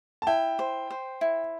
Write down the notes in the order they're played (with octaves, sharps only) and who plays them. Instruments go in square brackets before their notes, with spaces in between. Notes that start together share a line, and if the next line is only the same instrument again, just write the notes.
[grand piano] A5
[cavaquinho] E4 [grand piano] G5
[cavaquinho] C5
C5
E4